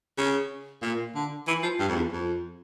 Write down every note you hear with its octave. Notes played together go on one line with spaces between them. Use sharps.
C#3
A#2
D3
E3
F3
G2
F2
E2
F2